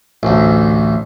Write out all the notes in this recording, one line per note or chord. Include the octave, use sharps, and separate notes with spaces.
A1 D2